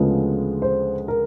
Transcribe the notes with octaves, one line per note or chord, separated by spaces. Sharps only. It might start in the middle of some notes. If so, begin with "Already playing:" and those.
Already playing: D2 C#3 F3 G#3 B3
C5
A#4